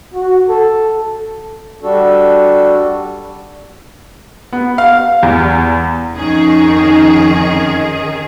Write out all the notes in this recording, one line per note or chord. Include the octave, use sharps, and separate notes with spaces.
F#4
A4
G3 D4 F#4 A4
B3
F5
E2
F2 D#3 C#4 D#4 G#4